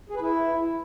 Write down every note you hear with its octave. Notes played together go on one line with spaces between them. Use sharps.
G#4
B4
E4